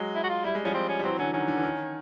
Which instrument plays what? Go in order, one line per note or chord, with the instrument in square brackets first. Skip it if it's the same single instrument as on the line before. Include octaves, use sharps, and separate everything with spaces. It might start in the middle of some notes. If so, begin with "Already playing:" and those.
Already playing: [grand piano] F#3 G#3
[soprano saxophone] E4
F#4
F4
[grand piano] G3 [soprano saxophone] E4
[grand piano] G#3
[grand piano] F3 G3 [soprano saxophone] C#4
[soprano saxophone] C4
C#4
[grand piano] G3
[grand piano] E3 F#3 [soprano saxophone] C4
[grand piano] D3 E3 [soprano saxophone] C#4
[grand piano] D#3 [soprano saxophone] C#4
[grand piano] D3
E3
D#3